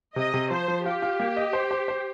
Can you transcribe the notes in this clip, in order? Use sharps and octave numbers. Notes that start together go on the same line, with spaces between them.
C3 D#5
C3
F3 C5
F3
F4 G4
F4
A#3
D#5
C5
C5
C5